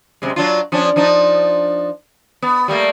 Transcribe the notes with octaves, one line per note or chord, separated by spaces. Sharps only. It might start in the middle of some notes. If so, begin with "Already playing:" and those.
F#2 C3 G#3
F#3 D4 F4
F3 C#4 D4
F3 D4 D#4
B3
G3 A3 A#3